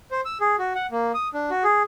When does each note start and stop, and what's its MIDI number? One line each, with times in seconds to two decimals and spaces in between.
0.11 0.21 72
0.25 0.38 88
0.41 0.56 68
0.59 0.73 66
0.75 0.86 78
0.91 1.12 58
1.14 1.28 87
1.34 1.50 62
1.50 1.63 66
1.64 1.82 68